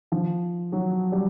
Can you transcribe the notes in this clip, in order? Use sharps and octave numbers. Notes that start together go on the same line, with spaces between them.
F3
F#3
G3